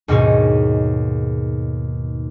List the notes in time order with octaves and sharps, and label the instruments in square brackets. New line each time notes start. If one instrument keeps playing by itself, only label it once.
[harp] D#2 G#2 B2 D#4 G#4 C#5